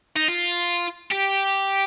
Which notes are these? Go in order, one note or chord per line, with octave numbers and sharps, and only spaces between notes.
D#4
F4
G4